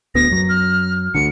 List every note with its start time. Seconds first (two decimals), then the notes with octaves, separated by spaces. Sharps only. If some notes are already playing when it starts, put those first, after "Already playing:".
0.15 D1 D2 B3 A#6
0.31 F#2 F#3
0.49 F6
1.15 D2 D3 C#7